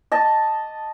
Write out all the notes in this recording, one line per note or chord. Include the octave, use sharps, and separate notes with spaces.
D#5 A5